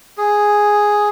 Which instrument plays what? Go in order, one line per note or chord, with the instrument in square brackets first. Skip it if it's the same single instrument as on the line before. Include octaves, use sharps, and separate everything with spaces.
[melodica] G#4